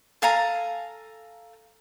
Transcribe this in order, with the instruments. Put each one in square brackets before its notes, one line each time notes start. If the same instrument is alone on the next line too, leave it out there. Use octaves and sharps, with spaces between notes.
[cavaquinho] A4 F5 G#5 A#5